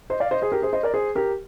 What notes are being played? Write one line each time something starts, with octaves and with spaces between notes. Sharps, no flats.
C5 D#5
D5 F5
C5 D#5
G#4 C5
G4 A#4
G#4 C5
C5 D#5
A#4 D5
G#4 C5
G4 A#4